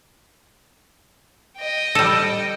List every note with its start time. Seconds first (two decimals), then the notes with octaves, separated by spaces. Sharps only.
1.58 D#5 G5
1.95 G3 A4